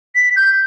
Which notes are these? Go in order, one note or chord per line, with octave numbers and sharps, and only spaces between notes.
B6
G6